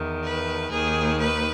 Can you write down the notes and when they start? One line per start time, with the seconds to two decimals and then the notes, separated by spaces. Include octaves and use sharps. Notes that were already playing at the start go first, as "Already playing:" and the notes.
Already playing: E2 D#3
0.23 B4
0.70 D#2 D#3 G#4
1.19 B4